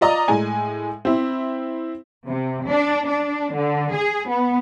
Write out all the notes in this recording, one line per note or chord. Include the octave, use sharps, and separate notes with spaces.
F4 D5 D#5 A#5 D#6
A2 G#3 G#5
C4 E4
C3
D4
D4
D3
G#4
B3